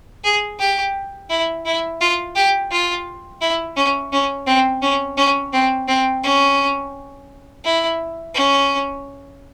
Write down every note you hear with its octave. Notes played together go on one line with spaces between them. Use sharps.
G#4
G4
E4
E4
F4
G4
F4
E4
C#4
C#4
C4
C#4
C#4
C4
C4
C#4
E4
C#4